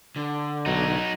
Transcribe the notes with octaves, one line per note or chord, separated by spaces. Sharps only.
D3
B1 F#3 D#4